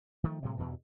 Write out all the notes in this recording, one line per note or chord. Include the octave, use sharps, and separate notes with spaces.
D#3 F3 A3
A2 C3 F#3 G#3
E2 G2 B2 E3